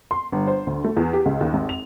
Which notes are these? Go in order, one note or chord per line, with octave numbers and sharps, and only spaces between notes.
C6
G1
C5
D2
A3
E2
G4
C#2
D#2
G#1
F7